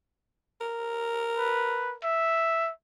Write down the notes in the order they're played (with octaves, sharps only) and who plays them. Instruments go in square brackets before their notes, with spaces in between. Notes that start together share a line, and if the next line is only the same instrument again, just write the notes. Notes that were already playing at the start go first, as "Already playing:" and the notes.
[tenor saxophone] A#4
[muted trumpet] B4
E5